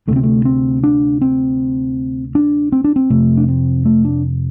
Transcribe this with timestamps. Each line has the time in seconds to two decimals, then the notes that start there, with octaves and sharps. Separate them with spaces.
0.08 D2 C3 A3
0.16 C4
0.23 A3
0.45 C4
0.83 D4
1.21 C4
2.35 D4
2.72 C4
2.84 D4
2.96 C4
3.10 F2 C3 A3
3.37 D4
3.48 C4
3.85 A3
4.05 D4